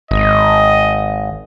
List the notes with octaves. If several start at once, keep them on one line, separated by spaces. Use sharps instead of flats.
G#1 D#5